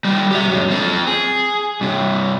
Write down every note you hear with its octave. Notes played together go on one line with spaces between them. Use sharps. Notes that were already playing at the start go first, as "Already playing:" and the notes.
G3 F4
G4 E5
F#2 G#3
F3 C4
G#4
G2 C3